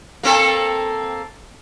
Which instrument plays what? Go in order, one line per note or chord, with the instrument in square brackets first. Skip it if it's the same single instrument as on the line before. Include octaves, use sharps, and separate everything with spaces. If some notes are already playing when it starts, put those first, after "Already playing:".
[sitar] A#3 C4 A4